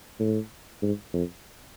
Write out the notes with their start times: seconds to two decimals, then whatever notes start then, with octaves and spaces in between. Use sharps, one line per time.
0.19 A2
0.82 G#2
1.13 F2